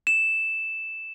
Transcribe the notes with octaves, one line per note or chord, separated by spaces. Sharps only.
E7